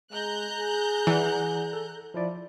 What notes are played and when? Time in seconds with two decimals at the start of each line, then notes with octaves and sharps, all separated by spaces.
0.13 G#3 A#5 F#6 G6
0.57 G#4
1.07 E3 D5 F#5
1.73 A4
2.14 F3 E4 D5